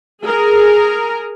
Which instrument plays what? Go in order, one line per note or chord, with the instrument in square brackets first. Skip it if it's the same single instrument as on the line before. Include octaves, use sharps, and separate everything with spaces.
[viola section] G#4 A#4